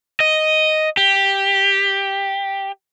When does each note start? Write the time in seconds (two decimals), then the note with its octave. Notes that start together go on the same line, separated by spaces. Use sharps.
0.20 D#5
0.97 G4